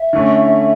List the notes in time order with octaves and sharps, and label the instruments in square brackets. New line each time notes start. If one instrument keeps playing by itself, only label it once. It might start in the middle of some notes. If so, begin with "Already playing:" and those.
Already playing: [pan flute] E5
[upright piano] D3 A3 C#4